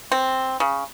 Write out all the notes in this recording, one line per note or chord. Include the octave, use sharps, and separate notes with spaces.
C4
C#3